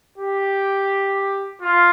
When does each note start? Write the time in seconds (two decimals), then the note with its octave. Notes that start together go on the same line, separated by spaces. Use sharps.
0.18 G4
1.62 F4